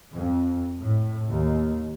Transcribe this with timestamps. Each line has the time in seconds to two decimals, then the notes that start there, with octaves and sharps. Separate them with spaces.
0.13 F2
0.79 A2
1.31 D#2